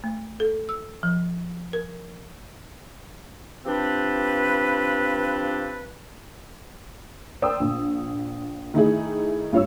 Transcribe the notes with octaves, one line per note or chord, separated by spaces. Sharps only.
A3
A4
E6
F3
A#4
F3 C4 D4 G4 B4
A#4 C5 D5 G5 D#6 E6
A#1
D#3 A3 D#4 E4 G#4
G2 F4 C#5 E6